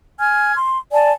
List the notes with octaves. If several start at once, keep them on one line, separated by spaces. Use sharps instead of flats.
G#5 F6 G#6
C6
D5 G#5 A5